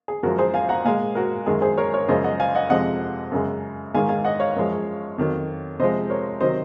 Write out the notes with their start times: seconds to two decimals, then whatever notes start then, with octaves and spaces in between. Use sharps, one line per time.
0.08 G#4
0.23 F#2 F3 G#3 F#4 A#4
0.38 G#4 C5
0.54 F5 G#5
0.69 F#5 A#5
0.84 A#2 G#3 F5 G#5
1.15 F#4 A#4
1.46 F#2 D#3 G#3 G#4
1.62 G#4 C5
1.77 A#4 C#5
1.94 A#4 C#5
2.08 F#2 C#3 F3 G#3 C5 D#5
2.24 D#5 F#5
2.40 F5 G#5
2.55 D#5 F#5
2.70 F2 C3 F3 G#3 D#5 F#5
3.32 F#2 C#3 G#3
3.95 G#2 D#3 G#3 F5 G#5
4.09 F5 G#5
4.25 D#5 F#5
4.40 C#5 F5
4.56 F#2 F3 G#3
5.18 F2 D#3 F#3
5.79 C3 F3 G#3 C5 D#5
6.10 A#4 C#5
6.41 C3 D#3 F#3 C5 D#5